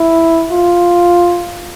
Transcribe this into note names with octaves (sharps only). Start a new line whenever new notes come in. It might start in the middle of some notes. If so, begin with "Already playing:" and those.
Already playing: E4
F4